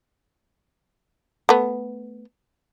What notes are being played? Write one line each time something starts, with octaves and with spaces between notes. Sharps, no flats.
A3 B3